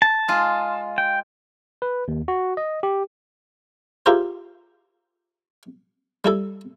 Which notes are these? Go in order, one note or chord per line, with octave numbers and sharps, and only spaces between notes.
A5
G#3 F4
G5
B4
D#2
F#4
D#5
G4
E4 F4 G4 G#4 A#4 C5
G3 E4 A4